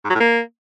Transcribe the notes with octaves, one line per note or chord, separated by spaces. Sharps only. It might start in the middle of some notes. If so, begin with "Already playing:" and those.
G#2
F#3
A2
A#3